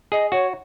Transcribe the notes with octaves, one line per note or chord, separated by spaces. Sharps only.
G#4 D#5
F#4 C#5